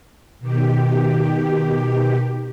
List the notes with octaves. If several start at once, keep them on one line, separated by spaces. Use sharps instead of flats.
B2 D#3 G4